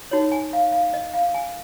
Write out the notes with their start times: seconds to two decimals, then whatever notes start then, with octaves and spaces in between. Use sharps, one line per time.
0.11 D#4 F#4 C#5
0.32 G#5
0.53 F5
0.72 F5
0.94 D#5
1.14 F5
1.34 G#5